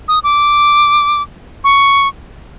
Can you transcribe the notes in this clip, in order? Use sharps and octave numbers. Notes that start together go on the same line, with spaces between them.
D#6
D6
C#6